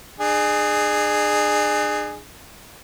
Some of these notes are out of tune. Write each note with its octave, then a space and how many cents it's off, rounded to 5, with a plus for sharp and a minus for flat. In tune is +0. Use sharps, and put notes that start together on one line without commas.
D4 +45 G#4 +0